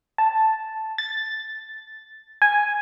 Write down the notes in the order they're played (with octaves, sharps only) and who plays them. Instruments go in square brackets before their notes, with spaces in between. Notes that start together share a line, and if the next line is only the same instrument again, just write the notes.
[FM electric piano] A5
A6
G#5